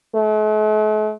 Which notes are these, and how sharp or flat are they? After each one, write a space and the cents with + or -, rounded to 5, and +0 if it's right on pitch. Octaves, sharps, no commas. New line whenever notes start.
A3 -45